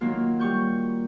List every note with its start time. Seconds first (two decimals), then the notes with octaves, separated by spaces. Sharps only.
0.01 D#3 F#3 A#3 F4
0.40 G3 C#6 G6